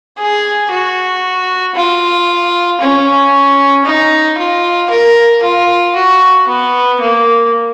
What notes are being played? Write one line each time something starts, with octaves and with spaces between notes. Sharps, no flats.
G#4
F#4
F4
C#4
D#4
F4
A#4
F4
F#4
B3
A#3